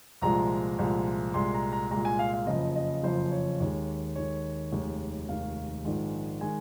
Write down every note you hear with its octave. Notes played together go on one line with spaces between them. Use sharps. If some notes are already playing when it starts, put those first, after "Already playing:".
C2 A#2 F3 G#3 A#5
C2 A#2 F3 G#3
C2 A#2 G#3 C6
A#5
A#5
C2 A#2 G#3 A#5
G#5
F5
F5
F#1 F2 C#3 F3 D#5
D#5
F#1 F2 C#3 F3 C5
C#5
D#2 D#3 G#3
D#2 D#3 G#3 C#5
F1 D#2 D#3 G#3
F1 D#2 D#3 G#3 F5
A#1 G#2 D#3 G#3
D#3 G#3 G#5